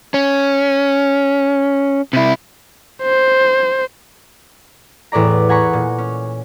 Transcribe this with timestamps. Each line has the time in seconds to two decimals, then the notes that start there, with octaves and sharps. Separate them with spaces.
0.14 C#4
2.13 C3 E4
3.03 C5
5.12 E2 A2 B4 D5 A#5
5.49 F#5 G#5 A#5 B5 C#6
5.73 A#2
5.98 C#4